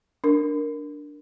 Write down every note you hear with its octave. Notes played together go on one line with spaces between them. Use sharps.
D4 A#4